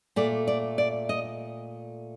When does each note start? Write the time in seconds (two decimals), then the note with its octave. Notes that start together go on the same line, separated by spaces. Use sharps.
0.16 A#2 A3 D5
0.47 D5
0.78 D5
1.09 D#5